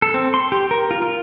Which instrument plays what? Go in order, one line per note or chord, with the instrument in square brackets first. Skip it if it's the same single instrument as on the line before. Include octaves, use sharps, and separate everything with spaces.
[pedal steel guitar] A4
C4
C6
G4
A#4
F4
F4